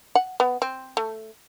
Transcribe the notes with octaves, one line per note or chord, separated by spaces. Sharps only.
F#5
B3
C4
A3